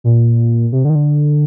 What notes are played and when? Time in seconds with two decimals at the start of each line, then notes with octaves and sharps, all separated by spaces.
0.04 A#2
0.72 C3
0.85 D3
0.90 D#3
0.95 D3